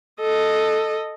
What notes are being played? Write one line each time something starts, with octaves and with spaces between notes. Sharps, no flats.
A4 D#5